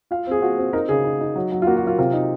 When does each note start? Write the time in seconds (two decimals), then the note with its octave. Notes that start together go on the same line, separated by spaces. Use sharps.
0.11 F4 F5
0.27 C4 G#4
0.42 F4 F#4
0.58 C4
0.73 D#4 A#4
0.89 C#3 G#4
1.05 D#4
1.21 D#4
1.36 F#3
1.52 F#3
1.62 F4
1.67 A#3 F#4
1.77 F#4
1.83 F#3 F4
1.99 C3 F4
2.13 D#4